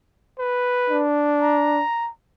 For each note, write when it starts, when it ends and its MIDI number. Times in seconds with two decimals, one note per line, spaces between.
0.39 1.04 71
0.90 1.81 62
1.42 2.10 82